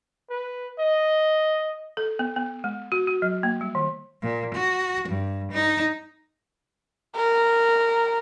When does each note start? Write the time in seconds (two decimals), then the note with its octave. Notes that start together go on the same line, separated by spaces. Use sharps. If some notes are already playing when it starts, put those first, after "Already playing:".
0.30 B4
0.79 D#5
1.97 A4
2.19 B3
2.36 B3
2.64 G#3
2.92 F#4
3.07 F#4
3.22 F#3
3.43 A#3
3.61 G3
3.75 D#3
4.22 A#2
4.55 F#4
5.08 G2
5.52 D#4
7.16 A#4